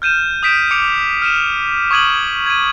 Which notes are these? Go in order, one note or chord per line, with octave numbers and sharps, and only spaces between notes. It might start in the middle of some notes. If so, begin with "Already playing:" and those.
F6 G6 D#7 E7
D#6 G6 B6 D7 E7
D6 C#7 D7 F7
F6 D#7 E7
C#6 D#6 G#6 D#7 F#7
G#6 D#7